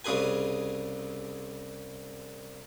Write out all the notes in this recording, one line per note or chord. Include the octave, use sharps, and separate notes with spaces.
C2 C#3 G#4 B4 G#5